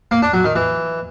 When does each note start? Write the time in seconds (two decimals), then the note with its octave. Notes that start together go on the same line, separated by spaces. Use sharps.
0.11 A#3
0.22 D4
0.33 F#3
0.44 D#3
0.56 E3